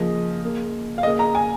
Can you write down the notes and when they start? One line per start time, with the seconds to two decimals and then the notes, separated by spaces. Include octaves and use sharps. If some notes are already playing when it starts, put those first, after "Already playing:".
Already playing: C#3 F3 A#3 D#5
0.42 C#3 A#3
0.98 F5
1.03 C#3 A#3 D#5
1.19 A#5
1.35 G#5